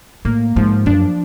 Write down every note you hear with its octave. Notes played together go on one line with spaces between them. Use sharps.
A2 A#3
G#2 F3
F#2 D4